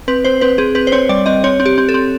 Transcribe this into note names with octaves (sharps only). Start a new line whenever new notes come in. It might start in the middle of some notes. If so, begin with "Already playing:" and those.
C4 B4
C4 C5
C4 B4
C4 G#4
C4 B4
C5
C4 C#5
G3 D5
C4 D#5
C4 C#5
C4
G4
C4
A4
C4